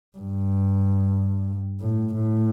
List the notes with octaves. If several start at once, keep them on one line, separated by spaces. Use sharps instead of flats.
G2
A2
A2